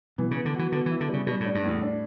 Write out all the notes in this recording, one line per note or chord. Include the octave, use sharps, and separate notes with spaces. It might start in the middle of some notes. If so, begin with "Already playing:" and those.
B2 E3
C#3 B3
D3
E3 F#4
D3 B3
E3
E4
D3
C#3 G3
B2 G3
A2 D4
G2
E2 A2
D4